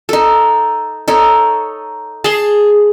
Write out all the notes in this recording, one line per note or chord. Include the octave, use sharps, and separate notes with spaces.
D#4 A4
D#4 A4 C#5
G#4 A5 C6